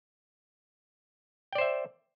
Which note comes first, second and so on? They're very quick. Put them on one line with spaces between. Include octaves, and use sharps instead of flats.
G5 D5 C5 E5